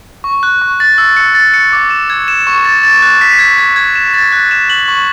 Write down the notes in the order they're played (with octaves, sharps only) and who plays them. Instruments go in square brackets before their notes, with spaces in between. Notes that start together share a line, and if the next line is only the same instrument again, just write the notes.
[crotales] C#6
F#6
C#6
A6
E6
C#7
A6
C#7
D6
E7
G#6
E7
C#6
A6
A6
F#6
B6
G#6
G#6
G#6
E7
A6
F#6
E7
F#7
C#6